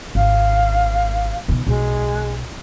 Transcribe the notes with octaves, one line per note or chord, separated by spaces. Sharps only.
G#1 F5
B2 D#3
B1 G#3